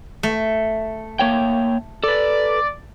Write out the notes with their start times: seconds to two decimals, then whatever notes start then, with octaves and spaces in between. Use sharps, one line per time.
0.23 A3
1.19 A#3 C#5 G5
2.04 A4 B4 D5